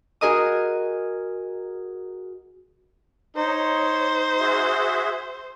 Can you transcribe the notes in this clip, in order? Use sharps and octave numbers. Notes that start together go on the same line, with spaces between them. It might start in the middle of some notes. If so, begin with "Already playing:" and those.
F#4 G#4 A#4 D#5 D#6
D#4 C5 C#5
F#4 G#4 E5